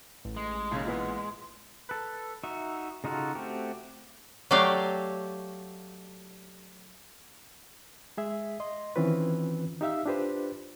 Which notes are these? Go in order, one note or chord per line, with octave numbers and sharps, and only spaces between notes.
A1
G#3
D#2 C#3
A#2 E3 B3
A4 B4
D#4 F#4 E5
C#3 D#4 F4 F#4 A4
A3 C4 F#4 G4
F#3 A3 G4 D5 F5
G#3 G#4 E5
D#5 C6
D#3 E3 C4 C#4 F4 B4
D#4 G4 E5 F5 E6
D4 F4 G4 B4 C5